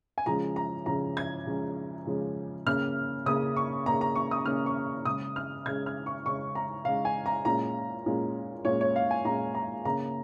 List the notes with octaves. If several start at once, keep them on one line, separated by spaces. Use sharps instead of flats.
G#5
C#3 F3 G#3 C#4 A#5
A#5
C#3 F3 G#3 C#4 A#5
G#6
C#3 F3 G#3 C#4
C#3 F3 G#3 C#4
C#3 A#3 C#4 F6
C#3 A#3 C#4 D#6
C#6
C#3 A#3 C#4 A#5
A#5
C#6
D#6
C#3 A#3 C#4 F6
C#6
C#3 G#3 C#4 D#6
F6
C#3 G#3 C#4 G#6
F6
C#6
C#3 G#3 C#4 C#6
A#5
C#3 G#3 C#4 F5
G#5
A#5
A#2 G#3 C#4 A#5
A#2 G#3 C#4
A#2 G#3 C#4 C#5
C#5
F5
G#5
A#2 G#3 C#4 A#5
A#5
C#3 A#3 C#4 A#5